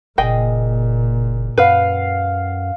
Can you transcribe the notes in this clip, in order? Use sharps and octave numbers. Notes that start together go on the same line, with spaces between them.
F#1 A#2 G#4 D#5 G5
F#2 B4 F5 F#5